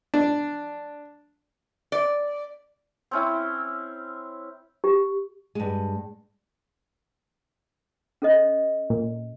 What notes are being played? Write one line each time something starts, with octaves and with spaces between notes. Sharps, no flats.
D4
D5
C4 C#4 E4
G4
G2 G#3
C#4 A4 D#5
A#2